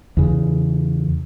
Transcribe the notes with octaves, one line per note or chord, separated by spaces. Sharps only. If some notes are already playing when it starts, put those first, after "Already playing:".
E2 C#3